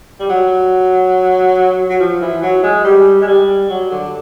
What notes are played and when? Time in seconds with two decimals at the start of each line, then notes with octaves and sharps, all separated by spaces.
0.19 G3
0.29 F#3
1.89 F#3
2.00 F3
2.21 E3
2.42 F#3
2.63 G#3
2.85 G3
3.21 G#3
3.27 G3
3.69 F#3
3.91 D3